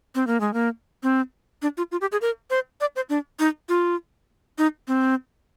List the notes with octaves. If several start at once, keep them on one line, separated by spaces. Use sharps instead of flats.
C4
A#3
G#3
A#3
C4
D4
F4
F4
G4
G#4
A#4
C5
D5
C5
D4
D#4
F4
D#4
C4